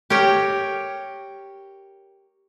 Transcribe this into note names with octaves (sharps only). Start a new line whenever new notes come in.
G4 A#4 C#5 G5